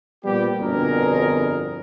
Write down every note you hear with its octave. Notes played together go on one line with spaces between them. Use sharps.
A#2 F3 G3 B3 G4
G1 F2 B2 D4 G#4 A#4